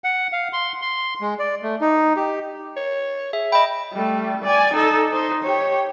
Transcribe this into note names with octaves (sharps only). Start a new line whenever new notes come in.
F#5
F5
C6
C6
G#3
D5
A3
D#4
G4
C#5
G#4 E5
D#5 G5 B5
G3 A3
D5 G#5
D#4 A4
D#4 C5
G4 C#5